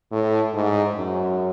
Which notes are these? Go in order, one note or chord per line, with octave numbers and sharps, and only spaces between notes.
A2
G#2
F#2